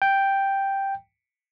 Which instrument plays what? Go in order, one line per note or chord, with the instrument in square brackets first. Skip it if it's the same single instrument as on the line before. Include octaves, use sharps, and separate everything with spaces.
[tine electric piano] G5